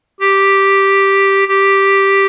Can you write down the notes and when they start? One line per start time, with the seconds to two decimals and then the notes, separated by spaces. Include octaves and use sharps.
0.20 G4
1.48 G4